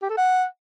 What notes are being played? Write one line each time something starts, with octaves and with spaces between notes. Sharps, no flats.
G4
A4
F#5